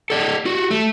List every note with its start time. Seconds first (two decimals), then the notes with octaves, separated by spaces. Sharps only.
0.10 A4 D5 D#5
0.45 F4 F#4
0.70 A3